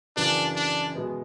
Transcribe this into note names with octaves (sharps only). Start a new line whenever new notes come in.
F#2 C#3 E3 D4
D4
B2 G#3 B3